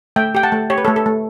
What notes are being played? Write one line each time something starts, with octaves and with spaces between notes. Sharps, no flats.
A3 E5 G5
G4 G5
F#5 A5
A3
G4 C#5
B4
A3 A4 C#5
A4
A3